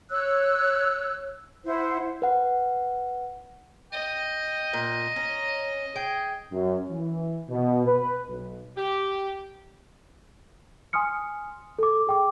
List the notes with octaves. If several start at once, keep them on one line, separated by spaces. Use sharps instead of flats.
C#5 E6 F#6
E4 C5 F#5
B4 F#5
D#5 G5
A#2
C#4 A#5
G#4 G5
F#2
E3
B2
B4
B1
G4
G#5 C6 D#6 F6 C#7
A4 D6
G#4 G5 D6